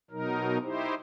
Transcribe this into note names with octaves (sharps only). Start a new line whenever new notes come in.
B2 F#3 D#4 A#4
D#4 E4 G4 C5